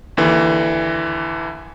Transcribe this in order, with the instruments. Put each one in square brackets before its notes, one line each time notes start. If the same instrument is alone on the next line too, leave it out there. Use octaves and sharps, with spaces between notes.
[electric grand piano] D#2 D3 E3